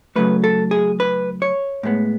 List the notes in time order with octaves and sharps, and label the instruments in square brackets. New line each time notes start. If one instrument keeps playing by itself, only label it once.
[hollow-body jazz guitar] C#3 F#3 A3 B4
A4
G#4
B4
C#5
A2 G#3 B3